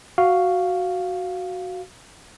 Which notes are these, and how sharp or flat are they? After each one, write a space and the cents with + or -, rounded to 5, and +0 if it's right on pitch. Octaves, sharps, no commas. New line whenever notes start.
F#4 +0 F5 +0